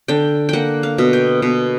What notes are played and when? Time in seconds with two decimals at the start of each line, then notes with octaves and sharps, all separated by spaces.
0.08 D3 G5
0.49 A#3 F#5 G5
0.83 F5
0.98 B2
1.13 G5
1.42 B2